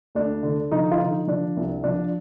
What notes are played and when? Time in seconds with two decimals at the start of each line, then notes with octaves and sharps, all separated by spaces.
0.15 D2 D4
0.43 D3
0.72 F3 D#4
0.91 F4
1.00 D3 D#4
1.27 F3 D4
1.57 C2
1.84 F3 D4